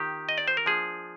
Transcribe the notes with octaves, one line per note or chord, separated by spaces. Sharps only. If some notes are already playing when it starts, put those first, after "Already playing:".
Already playing: D#3 A#3 F4 G4
D#5
D5
C5
A#4
F3 A#3 D4 G#4